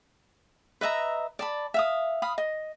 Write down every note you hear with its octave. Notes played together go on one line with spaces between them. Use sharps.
B4 D#5 E5 A#5
D5 A5 B5
E5 F5 D#6
F5 B5 D#6
D#5